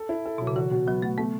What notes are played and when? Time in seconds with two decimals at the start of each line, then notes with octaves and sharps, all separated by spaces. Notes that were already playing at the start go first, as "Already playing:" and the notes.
Already playing: A4
0.09 E4
0.26 A4
0.38 B2 F#3
0.47 C#3
0.56 E3 F#4
0.71 B2
0.87 F#3 B3
1.02 A3 F#4
1.18 A3 B3